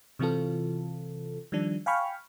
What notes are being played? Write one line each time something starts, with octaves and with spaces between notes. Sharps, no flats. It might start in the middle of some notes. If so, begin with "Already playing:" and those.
C3 E3 C4 F4 A4
D#3 F3 G3 D4
F5 G5 G#5 B5 C#6 F6